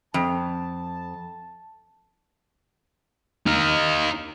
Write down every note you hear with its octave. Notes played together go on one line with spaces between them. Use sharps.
F2 A5
D#4 F5